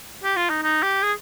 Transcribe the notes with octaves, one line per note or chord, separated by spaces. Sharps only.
G4
F4
D#4
D#4
G4
G#4